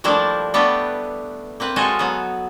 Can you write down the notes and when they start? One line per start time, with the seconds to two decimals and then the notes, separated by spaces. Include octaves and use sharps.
0.04 F3 G3 A3 A#3 D4 E4
0.54 G3 A3 B3 D4 G4 B4
1.60 A#3 C4 B4
1.76 G#3 F4 F#4 A4 C#5 D#5
1.99 F#3 B3